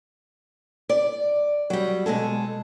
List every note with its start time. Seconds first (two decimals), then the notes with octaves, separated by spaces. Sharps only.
0.89 D5
1.70 F#3 G3
2.06 B2 G#3 G#4 A4